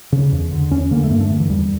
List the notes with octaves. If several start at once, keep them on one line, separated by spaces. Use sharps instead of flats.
C#3
E2
D3
E2 C#4
D3 A#3
A3
G2 A#3
A3
D3
E3
E2 G3